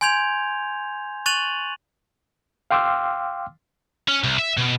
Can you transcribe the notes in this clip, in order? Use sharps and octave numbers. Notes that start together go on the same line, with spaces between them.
G#5 C6 G6 G#6 F7
C#6 F#6 A6 D#7 F7 F#7
F5 G5 C6 D6 E6 F6
C#4
C2
E5
B2